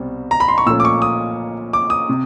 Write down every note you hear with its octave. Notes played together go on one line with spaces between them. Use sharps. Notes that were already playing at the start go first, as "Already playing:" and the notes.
Already playing: C2 B2 G3 C4
A#5
B5
C6
C#6
A#2 F3 A3 C#4 E6
D6
C#6
D#6
D6
D#6
C3